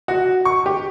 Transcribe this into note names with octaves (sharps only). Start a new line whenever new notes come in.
F#4
C#6
G4